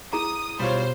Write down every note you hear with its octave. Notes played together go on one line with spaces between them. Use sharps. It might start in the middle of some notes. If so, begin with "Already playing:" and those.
E4 G#4 A#5 D#6
B2 G3 F4 C5 C#5